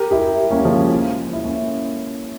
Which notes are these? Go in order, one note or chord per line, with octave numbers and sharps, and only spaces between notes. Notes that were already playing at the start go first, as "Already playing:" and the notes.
Already playing: G4 A#4
E4 G4
A#3 C#4
F3 G#3
E4
A#3 C#4